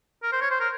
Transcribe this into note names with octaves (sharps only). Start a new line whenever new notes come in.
A#4
C5
C#5
C5
A#4